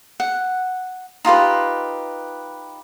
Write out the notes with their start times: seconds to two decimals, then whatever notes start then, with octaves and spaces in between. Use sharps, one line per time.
0.20 F#5
1.25 D#4 F4 G4 B4